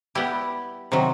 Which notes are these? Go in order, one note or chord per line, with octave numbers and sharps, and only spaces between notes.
G3 B3 E4 G4
C3 D#3 F#3